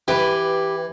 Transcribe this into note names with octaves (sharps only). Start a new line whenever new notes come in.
E3 G4 B4